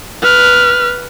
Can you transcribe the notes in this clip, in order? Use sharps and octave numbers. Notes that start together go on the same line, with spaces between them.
B4 F6